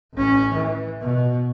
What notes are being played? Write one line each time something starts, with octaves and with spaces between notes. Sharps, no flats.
A1 C#4
E3
B2